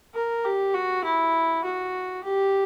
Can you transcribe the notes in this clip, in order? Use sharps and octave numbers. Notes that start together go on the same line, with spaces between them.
A#4
G4
F#4
E4
F#4
G4